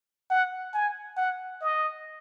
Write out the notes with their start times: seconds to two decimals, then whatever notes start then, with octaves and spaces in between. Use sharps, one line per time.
0.30 F#5
0.74 G#5
1.17 F#5
1.61 D#5